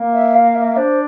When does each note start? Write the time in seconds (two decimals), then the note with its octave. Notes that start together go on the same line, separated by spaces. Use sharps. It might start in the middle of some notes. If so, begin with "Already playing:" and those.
Already playing: A#3
0.14 E5
0.35 F5
0.55 E5
0.77 D4 C5